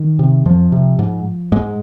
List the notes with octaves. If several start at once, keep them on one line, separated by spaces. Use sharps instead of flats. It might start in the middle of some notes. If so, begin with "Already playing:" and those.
Already playing: D#3
C3
F2 F3
C3
G#2
G#2 G#3